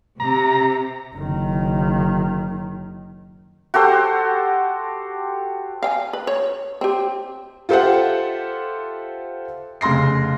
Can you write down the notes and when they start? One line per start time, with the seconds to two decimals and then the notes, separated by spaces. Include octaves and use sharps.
0.20 C3 A#5
1.15 F#1 D#3
3.74 F#4 G4 A4 C5
5.83 F5 G5 G#5
6.13 B4
6.27 C#5
6.81 C4 G4
7.69 F4 G4 A4 C5 E5 F#5
9.81 F1 C#3 C6 A#6 C7